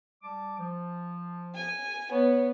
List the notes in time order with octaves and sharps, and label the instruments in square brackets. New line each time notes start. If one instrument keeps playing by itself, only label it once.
[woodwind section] G3 A5 D6
F3
[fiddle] G#5
[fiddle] B3 [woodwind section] C#5